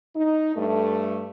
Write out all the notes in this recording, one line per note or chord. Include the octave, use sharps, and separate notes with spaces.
D#4
G2 A3